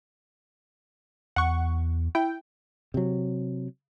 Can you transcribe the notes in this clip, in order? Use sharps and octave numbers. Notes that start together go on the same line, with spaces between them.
E2 F#5 C#6
E4 G5
C3 F#3